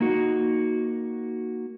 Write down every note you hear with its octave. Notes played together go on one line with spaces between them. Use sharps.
A#3 D#4 F#4